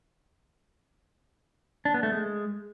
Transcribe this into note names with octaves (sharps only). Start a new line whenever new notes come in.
D4
B3
A3
G#3